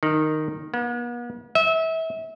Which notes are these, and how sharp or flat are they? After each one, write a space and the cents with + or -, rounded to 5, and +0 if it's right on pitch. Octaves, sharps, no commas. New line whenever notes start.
D#3 -10
B3 -45
E5 -30